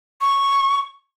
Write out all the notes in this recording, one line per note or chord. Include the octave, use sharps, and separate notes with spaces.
C#6